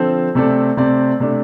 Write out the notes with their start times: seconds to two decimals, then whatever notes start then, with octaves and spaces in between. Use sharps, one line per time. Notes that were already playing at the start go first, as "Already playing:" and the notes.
Already playing: D3 F3 C4 A4 C5
0.35 C3 A3 C4 A4 D5
0.77 C3 A3 C4 A4 D5
1.20 C3 A3 D4